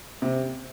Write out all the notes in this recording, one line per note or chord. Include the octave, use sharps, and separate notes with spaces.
C3